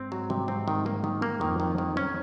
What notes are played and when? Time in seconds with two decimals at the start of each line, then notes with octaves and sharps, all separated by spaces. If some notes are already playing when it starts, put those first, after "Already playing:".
Already playing: G#2 C4
0.12 F#3
0.30 C3
0.48 C4
0.68 D#3
0.86 A#3
1.04 D#3
1.22 A#3
1.41 F2 D#3
1.60 D#3
1.78 D#3
1.97 C#4